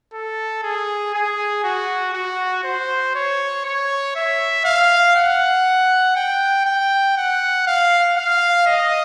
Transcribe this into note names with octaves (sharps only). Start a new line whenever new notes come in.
A4
G#4
G#4
F#4
F#4
C5
C#5
C#5
E5
F5
F#5
G5
G5
F#5
F5
F5
D#5